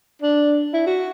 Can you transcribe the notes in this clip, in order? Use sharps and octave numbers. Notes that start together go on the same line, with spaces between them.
D4
E4
F#4